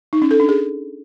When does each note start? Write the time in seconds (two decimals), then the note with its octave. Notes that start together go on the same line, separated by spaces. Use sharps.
0.13 D#4
0.22 C#4
0.31 A4
0.40 D4
0.49 G#4